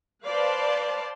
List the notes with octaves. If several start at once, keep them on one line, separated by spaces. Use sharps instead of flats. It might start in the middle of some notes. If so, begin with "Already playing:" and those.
B4 C5 D5 F5 A5 C6